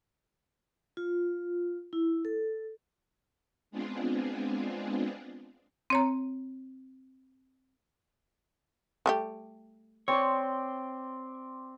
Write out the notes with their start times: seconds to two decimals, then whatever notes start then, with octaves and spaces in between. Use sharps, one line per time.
0.97 F4
1.93 E4
2.25 A4
3.71 G#3 B3 C4 D4 F4 G#4
5.90 C4 C#5 A#5
9.06 G3 A3 G4
10.08 C4 C#5 D5 C6